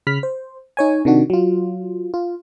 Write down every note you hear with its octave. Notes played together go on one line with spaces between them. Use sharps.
C#3 B5 F6 B6
C5
D#4 C#5 G#5
C3 D#3 D4 F#4
F#3 F4
F4